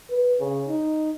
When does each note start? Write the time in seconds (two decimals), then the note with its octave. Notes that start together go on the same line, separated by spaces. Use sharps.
0.11 B4
0.40 C#3
0.69 D#4